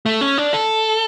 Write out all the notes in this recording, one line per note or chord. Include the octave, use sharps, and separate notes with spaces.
A3
C#4
D4
A4